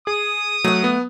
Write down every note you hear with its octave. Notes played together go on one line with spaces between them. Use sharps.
G#4 D#6
F#3 A3 F#5
B3